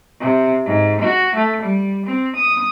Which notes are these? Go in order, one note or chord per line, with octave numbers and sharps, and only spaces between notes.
C3
G#2
F#4
A3
G3
C4
D#6